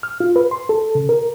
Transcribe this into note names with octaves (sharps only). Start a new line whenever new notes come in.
F6
F4
B4
C6
A4
C#3
A#4